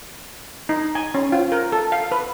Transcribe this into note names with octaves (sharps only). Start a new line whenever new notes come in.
D#4
G#5
C#4
F4
A#4
A4
F5
B4